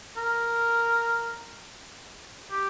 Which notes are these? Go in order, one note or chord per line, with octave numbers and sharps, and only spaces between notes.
A#4
G4